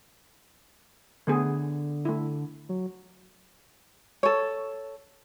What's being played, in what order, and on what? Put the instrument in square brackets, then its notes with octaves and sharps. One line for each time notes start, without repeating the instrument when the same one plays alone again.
[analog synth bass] D3 [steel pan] A3 B3 G#4
[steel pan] A3 E4
[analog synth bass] F#3
[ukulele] A4 C#5